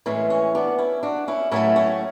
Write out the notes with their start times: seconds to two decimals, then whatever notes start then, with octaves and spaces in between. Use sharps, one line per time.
0.06 A2 E3 G#3 C#4
0.30 C#4
0.55 B3 D4
0.78 C#4 E4
1.03 D4 F#4
1.28 C#4 E4
1.51 A2 F#3 A3 C#4 E4
1.76 C#4